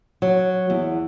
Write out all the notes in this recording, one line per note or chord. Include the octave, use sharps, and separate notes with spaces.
F#3
E2